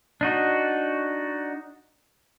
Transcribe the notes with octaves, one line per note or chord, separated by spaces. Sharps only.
D4 D#4 F#4